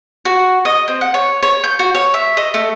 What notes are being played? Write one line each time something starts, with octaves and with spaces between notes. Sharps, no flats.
F#4
D#5
C4
F#5
C#5
C#5
G6
F#4
C#5
E5
D#5
A3